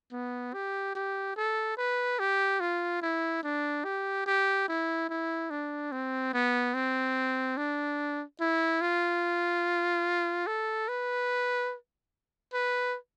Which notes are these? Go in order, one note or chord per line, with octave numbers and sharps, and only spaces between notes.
B3
G4
G4
A4
B4
G4
F4
E4
D4
G4
G4
E4
E4
D4
C4
B3
C4
D4
E4
F4
A4
B4
B4